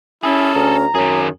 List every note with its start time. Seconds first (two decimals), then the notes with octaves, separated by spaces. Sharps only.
0.23 C#4 E4 G#4 A4
0.55 D2 A#5
0.95 F#2 D#3 G#4 C#5